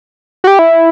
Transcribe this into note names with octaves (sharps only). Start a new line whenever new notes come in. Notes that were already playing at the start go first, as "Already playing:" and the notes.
F#4
G4
E4